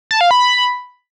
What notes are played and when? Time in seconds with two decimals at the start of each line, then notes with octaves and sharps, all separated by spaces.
0.11 A5
0.21 F5
0.31 B5